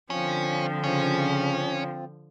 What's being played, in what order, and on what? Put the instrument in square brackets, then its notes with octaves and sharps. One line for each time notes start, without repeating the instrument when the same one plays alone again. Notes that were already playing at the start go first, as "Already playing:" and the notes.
[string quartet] D3 F3 [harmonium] C4 F4 [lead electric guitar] C#4
[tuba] C#3 [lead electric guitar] C#4